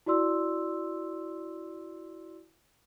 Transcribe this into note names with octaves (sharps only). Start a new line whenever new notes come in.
E4 F#4 D5 C6 E6